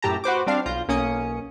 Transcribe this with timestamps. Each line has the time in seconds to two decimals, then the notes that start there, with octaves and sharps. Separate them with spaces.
0.02 F#2 A2 G4 A5 A#5
0.24 F#4 B4 C5 D6
0.46 G3 C4 D4 F5
0.66 B1 F4 G6 A#6
0.88 B1 A#3 C#4 D#6 C#7